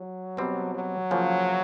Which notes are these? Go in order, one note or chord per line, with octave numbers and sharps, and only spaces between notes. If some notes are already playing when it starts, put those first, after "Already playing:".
Already playing: F#3
B2 G3 C4
F#3
C#3 F3 A#3